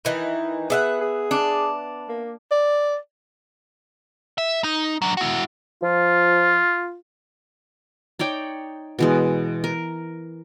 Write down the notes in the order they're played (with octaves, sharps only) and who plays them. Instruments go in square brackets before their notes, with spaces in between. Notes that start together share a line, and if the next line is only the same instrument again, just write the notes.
[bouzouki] D#3 E3 D#4
[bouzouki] B3 E5 F#5 [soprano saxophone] G#4
[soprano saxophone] G#4
[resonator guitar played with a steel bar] D4
[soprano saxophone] A#3
[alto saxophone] D5
[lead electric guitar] E5
D#4
F#3 D4
E4 F#4
[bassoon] F3 [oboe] F4
[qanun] D#4 C#5 D5 G5
B2 E3 G#3
A#4